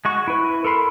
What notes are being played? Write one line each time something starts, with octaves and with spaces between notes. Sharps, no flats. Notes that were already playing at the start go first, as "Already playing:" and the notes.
G#3 F#4 C#6
E4 B4
A4 A#4 B5 C6